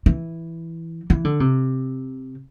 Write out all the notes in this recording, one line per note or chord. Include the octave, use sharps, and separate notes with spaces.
E3
E3
D3
C3